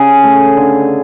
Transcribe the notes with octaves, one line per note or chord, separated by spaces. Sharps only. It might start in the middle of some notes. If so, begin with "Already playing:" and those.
Already playing: C#3 G#4
A3
D3